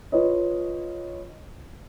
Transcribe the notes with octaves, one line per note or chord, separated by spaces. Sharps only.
F4 B4 C#5 D#5